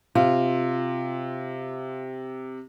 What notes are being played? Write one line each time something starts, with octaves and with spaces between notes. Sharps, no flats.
C3 F4